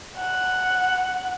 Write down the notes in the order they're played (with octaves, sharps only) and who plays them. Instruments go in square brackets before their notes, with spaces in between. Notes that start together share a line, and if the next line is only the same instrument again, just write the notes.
[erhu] F#5